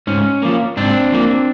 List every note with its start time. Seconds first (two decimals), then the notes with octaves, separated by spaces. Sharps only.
0.07 G#2 C#4
0.42 F3 A#3
0.77 G#2 C4 D4
1.12 F3 A#3